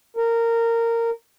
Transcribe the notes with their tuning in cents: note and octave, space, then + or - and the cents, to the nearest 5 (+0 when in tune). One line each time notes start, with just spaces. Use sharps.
A#4 -15